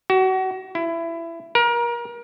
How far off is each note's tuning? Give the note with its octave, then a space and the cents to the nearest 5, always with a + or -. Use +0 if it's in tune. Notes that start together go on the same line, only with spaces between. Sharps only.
F#4 +30
E4 +20
A#4 +30